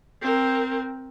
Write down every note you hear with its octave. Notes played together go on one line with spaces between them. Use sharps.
C4 A#4